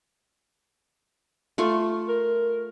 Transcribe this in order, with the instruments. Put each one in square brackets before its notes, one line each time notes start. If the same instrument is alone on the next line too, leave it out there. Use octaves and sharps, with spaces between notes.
[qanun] A3 F4 C#6
[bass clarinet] A#4